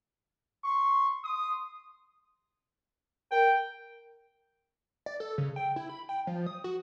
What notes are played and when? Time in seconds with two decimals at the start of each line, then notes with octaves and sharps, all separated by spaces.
0.64 C6 C#6
1.23 C6 D#6
3.31 A#4 G5
5.06 D5
5.20 A4
5.38 C#3
5.56 G5
5.76 E4
5.89 B5
6.09 G5
6.27 F3
6.47 D#6
6.64 F#4